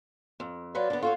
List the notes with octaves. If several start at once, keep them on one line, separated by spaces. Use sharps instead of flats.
F2
F#3 F4 B4 D5
D3 B3
F4 F#4 A4 C#5